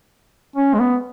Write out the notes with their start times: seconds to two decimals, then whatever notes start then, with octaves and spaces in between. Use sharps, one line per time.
0.56 C#4
0.74 G#3
0.79 B3